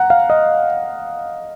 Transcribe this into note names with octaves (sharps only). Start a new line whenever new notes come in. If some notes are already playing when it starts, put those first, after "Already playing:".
Already playing: F#5 A#5
F5
D#5